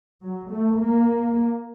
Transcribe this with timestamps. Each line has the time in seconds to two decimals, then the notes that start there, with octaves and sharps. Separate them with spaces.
0.23 F#3
0.51 A3
0.79 A#3